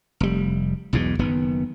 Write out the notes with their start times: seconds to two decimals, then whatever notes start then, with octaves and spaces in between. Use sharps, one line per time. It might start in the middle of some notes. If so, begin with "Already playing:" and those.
0.20 F1 G3
0.93 B1 E2 G#2 B2
1.19 F#1 D#3 B3